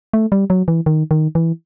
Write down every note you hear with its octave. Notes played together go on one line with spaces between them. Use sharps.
A3
G3
F#3
E3
D#3
D#3
E3